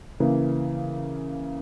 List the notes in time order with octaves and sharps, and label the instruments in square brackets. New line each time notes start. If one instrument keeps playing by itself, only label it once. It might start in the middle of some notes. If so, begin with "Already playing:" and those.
[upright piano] C#3 E3 A#3